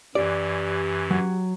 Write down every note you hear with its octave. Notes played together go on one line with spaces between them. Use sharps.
F#2 E3 G4 D5
F#3